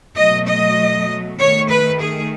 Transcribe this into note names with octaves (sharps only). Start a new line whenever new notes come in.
B2 F#3 A3 D#5
D#5
D#3 A3 C#5
B4
G#4